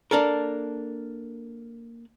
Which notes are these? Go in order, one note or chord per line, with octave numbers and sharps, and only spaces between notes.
A#3 D4 A4 A#4